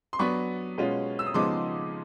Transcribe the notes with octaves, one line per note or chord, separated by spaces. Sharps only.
C6
F#3 B3 D4 B5 C#6
B2 G#3 C#4 F4
E6
D#6
C#3 F3 G#3 B3 D#4 C6 D6